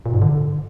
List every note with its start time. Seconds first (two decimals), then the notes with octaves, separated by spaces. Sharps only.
0.06 A#2
0.14 G#2
0.22 D3